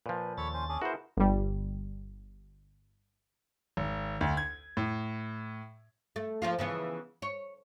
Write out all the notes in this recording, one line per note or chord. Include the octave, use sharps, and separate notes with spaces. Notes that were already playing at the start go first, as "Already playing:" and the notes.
A#2 F3 B4
D#2 A4 C#5 B5 A6
C#4 C5
C#4 D4 G#4
B3 E4 F#4 G#4 A#4 C5
G1 G3
G#1
D2
G#6
A2
A3
F3 A#3 F4
C#3 E3 B3
C#5